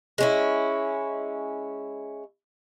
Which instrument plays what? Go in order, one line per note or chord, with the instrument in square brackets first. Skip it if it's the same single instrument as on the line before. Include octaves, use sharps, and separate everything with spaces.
[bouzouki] G#3 C#4 E4